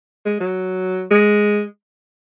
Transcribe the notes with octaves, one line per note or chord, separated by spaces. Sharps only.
G#3
F#3
G#3